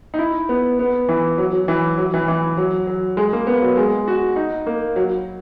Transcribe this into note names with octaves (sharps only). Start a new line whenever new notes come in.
D#4
E4
B3
B3
E3
F#3
F#3
E3
F#3
E3
E3
F#3
F#3
G#3
A#3
B3
F#3
G#3
F#4
D#4
A#3
F#3